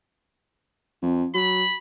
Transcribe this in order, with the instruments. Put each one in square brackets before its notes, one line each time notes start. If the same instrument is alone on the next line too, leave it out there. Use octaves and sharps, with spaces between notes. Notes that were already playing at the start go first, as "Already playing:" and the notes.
[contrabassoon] F2
[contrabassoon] F#3 [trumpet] B5